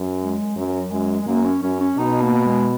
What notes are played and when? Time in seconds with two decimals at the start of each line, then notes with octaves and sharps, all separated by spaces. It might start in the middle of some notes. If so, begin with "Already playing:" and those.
Already playing: F#2
0.21 G#3
0.56 F#2 F#3
0.91 F#2 G#3
1.22 G#3
1.27 F#2 A#3
1.45 C#4
1.62 F#2 C#4
1.80 C#4
1.98 B2 D#4
2.21 A#3
2.45 G#3